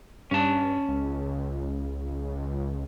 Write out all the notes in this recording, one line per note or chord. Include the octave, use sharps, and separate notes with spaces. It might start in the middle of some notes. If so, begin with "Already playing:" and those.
G2 C#4 A5
C#2